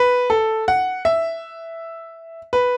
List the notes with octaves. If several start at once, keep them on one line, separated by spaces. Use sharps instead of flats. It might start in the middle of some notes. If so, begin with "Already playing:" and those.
Already playing: B4
A4
F#5
E5
B4